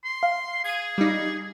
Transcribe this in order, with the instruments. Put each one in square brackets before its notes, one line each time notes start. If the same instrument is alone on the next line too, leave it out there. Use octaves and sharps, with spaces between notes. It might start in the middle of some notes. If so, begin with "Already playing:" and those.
[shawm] C6
[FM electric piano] F5
[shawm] G#4 [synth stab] G#6 D#7
[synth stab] G3 D#4